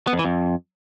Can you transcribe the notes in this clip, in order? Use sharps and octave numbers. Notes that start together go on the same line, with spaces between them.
B3
F2
E3
F2